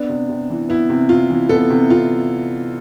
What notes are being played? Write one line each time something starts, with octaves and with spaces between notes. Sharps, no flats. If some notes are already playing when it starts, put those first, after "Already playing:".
Already playing: B3 D4
C3
C3
E3
B3 E4
C3
C3 F4
E3
B3 A4
C3
C3 F4